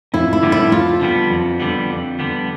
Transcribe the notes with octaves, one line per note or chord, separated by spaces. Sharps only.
F2 E4
E4
D3 G3 B3
E4
F2 F4
D3 G3 B3
F2
D3 G3 B3
F2
D3 G3 B3